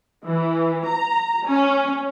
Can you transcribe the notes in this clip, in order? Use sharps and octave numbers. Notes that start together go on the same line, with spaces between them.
E3
A#5
C#4